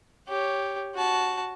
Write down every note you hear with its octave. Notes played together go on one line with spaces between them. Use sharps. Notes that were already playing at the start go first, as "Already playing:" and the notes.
G4 C#5
F#4 A5